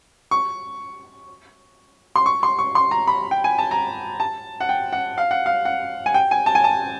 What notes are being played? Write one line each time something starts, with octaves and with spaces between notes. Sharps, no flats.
C#6
C6
C#6
C6
C#6
C6
A#5
B5
G5
G#5
A5
A#5
A5
F#5
G5
F#5
F5
F#5
F5
F#5
G#5
G5
G#5
A5
G#5
A5